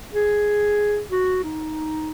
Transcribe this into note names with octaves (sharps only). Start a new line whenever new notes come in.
G#4
F#4
D#4